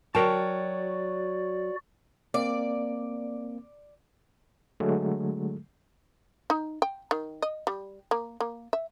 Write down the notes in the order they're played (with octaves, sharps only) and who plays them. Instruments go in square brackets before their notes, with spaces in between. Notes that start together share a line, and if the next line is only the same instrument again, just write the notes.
[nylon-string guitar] F#3 [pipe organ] F#4 D5 [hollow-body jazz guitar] A#4 G5 A5 [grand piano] C#6
[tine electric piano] A#3 C4 [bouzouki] D5
[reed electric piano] D3 F#3 G#3 A3
[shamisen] D#4
G5
D#3
D#5
G3
A#3
A#3
E5